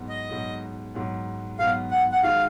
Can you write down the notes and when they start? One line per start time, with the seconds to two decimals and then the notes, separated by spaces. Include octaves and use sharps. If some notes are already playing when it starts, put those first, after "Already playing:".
Already playing: G#2 F#3 B3
0.09 D#5
0.30 G#2 F#3 B3
0.94 G#2 F#3 B3
1.59 G#2 F#3 B3 F5
1.91 F#5
2.12 F#5
2.23 D#3 G#3 D#4 F#4 F5